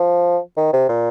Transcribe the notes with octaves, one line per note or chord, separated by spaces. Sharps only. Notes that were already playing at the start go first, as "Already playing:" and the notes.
Already playing: F3
D#3
C3
A#2